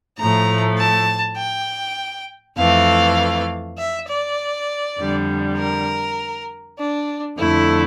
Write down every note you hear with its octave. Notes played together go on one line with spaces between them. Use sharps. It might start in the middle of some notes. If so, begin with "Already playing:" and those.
A2 F3 A3 A#5
A5
G5
F2 E3 A3 F5
E5
D5
F2 D3 G3
A#4
D4
F2 D3 A3 E4